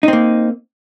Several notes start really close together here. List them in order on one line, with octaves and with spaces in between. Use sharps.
D#4 C4 A#3